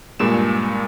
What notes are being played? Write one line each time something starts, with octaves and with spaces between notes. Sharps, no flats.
G2 A#2 G#3 E7